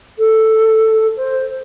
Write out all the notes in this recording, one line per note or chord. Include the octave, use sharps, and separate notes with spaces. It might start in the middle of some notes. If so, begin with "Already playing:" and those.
A4
C5